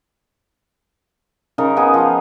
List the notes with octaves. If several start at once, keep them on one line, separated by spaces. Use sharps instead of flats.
C#3 D#4 A#4
B3 D#4 G#4
F3 F5